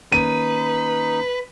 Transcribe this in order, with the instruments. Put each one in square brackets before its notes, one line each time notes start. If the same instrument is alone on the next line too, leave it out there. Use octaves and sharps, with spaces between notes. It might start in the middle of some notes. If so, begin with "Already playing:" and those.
[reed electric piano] D#3 A#3 C#4 [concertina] D#4 [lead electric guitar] B4 [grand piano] D#7